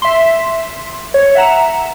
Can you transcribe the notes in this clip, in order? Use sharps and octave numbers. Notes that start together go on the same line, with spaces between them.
E5 C6
C#5
E5 F#5 A#5 E7